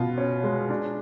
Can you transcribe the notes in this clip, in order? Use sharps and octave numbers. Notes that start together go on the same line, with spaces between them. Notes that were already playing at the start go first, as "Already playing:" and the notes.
Already playing: B2 F4
C#4
G#3
D4